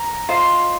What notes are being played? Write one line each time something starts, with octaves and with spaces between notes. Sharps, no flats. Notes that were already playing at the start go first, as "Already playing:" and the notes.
Already playing: A#5
F4 C5 D#5